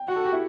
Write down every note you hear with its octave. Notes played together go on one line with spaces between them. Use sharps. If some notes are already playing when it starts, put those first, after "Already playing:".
Already playing: G5
F#4 F#5
A4
G4
E4